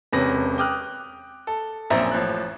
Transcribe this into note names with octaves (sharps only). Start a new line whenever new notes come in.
E1 C3 C#4 B4 A#6
G5 D6 D#6 F6 F#6
A4
A#1 F#2 C4 C5 E5 A#5
A1 F3 F#6